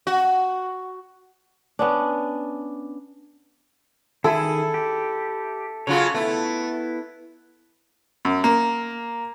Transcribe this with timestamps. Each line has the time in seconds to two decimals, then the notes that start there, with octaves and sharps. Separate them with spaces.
0.07 F#4
1.79 B3 C#4 D4
4.24 D#3 E4 G#4 A4
4.74 G4
5.87 C#3 F#3 F4 C#5
6.14 A3 B3 E4
8.25 F#2
8.44 A#3